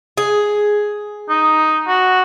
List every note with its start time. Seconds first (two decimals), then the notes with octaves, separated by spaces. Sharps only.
0.17 G#4
1.29 D#4
1.88 F#4